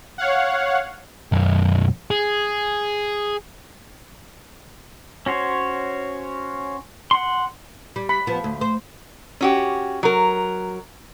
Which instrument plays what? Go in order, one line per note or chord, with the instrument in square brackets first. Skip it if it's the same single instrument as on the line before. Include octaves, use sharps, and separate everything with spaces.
[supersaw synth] C#5 F5 F#5
[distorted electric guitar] B1 F#2
G#4
[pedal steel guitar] C#4 F#4 C5 C#5
F#5 C6
[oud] G3
[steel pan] B5
[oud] F3 B3
D2
C5
[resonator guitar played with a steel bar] C#4 F#4 G4
F#3 A#4